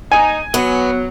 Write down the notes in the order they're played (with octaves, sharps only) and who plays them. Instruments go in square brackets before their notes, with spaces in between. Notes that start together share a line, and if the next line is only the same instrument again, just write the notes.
[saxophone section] D#4 [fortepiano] G#5
[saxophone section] F#3 [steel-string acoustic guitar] B3